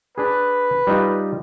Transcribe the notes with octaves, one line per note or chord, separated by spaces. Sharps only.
D4 G#4 B4
G3 D#4 F4